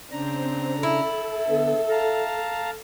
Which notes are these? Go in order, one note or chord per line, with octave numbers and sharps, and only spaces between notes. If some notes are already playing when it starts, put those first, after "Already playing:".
C#3 C4 D4 A#5
E4 A4
D3 B3
F5 A5 A#5